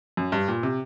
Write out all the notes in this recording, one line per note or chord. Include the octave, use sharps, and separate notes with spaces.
F#2
G2
A#2
C3